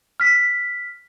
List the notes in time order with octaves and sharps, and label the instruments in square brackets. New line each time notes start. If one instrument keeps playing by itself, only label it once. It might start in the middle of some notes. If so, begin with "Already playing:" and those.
[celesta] F6 B6